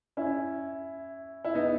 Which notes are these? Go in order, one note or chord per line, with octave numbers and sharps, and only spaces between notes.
C#4 E4
E4
B3 D#4